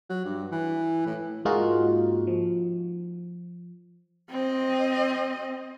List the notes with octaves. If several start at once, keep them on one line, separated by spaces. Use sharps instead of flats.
F#3
G2
E3
A2
G#2 G#3 A#3 D#4 F4 F#4
F3
C4 D#5